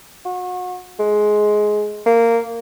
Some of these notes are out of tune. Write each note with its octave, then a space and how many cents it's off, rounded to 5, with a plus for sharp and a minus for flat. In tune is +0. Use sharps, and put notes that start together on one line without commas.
F#4 -35
G#3 +15
A#3 -10